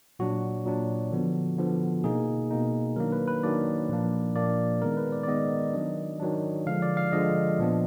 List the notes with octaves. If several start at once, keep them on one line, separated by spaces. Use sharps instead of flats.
A#2 F#3 D4 F#4
A#2 F#3 D4
D3 F3 B3
D3 F3 B3
B2 A#3 D#4 G#4
B2 A#3 D#4
D#3 F#3 A#3 D4 A#4
B4
B4
D#3 F#3 A#3 D4 D5
A#2 F3 A#3 D4
A#2 F3 A#3 D4 D5
D#3 G#3 B3 A#4
B4
D5
D5
D#3 G#3 B3 D#5
D#3 F#3 D4
D#3 F#3 D4
D3 F3 G#3 F5
D5
F5
D3 F3 G#3 D#5
A#2 F3 B3 D4